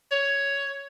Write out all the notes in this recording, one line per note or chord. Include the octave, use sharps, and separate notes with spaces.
C#5